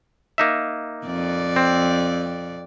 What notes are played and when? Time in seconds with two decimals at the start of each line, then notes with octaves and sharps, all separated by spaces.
0.38 A#3 D#4 E5
1.06 F2 D5
1.56 C4